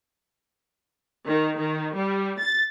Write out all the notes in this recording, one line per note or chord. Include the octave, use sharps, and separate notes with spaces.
D#3
D#3
G3
A6